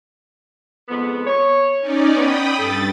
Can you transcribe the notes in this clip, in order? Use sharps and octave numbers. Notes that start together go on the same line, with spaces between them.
F2 G#2 B3
C#5
C#4 D#4 D5
B3 G5 B5 D#6
G2 A4 A6